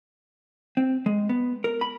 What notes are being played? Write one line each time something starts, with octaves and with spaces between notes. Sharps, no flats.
C4
G#3
B3
A#4
B5